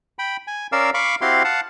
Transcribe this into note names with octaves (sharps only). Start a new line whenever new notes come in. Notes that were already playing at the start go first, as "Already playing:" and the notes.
G5 B5
G#5
C#4 A#4 D5 F5 E6
F5 B5 C#6 D6
C4 E4 F#4 G4 F5 C6
F5 F#5 A5